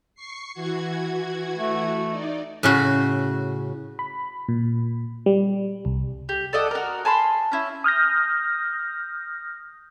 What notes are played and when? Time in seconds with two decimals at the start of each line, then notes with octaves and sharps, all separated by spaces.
0.15 C#6 C7
0.53 E3 F#4 G#6
1.57 A3
2.09 D#4 D5
2.63 A2 C#3 F#4
3.99 B5
4.48 A#2
5.26 G3
5.85 C2
6.29 G4
6.53 A4 D5 D#5 F#5
6.71 F#4 A#4
7.05 G#5 A5 B5 C6
7.52 C#4 E4
7.84 D#6 F6 G6 A#6